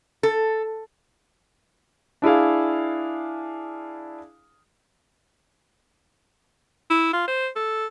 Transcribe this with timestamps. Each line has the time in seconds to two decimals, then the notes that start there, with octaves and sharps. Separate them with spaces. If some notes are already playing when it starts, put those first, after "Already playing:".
0.23 A4
2.22 D4 E4 G#4 F5
6.90 E4
7.13 F4
7.28 C5
7.56 A4